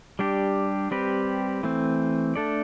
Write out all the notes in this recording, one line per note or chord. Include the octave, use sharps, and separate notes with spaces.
G3 D4 G4
G3 C4 G4 B4
E3 A3 C4
A3 D4 A4 D5